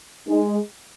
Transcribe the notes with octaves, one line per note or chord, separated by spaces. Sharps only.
G#3 D#4